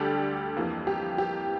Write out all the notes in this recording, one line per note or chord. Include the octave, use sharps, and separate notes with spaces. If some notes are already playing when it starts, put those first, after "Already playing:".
Already playing: D2 D3 G3 D4 G4 A4
F2 E3 A#3
G4
G4